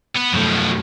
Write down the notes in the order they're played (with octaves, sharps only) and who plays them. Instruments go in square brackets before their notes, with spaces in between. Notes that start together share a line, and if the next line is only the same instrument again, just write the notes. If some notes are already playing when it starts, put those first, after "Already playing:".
[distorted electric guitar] B3
[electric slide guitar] F#2 A3 [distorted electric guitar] B2 F3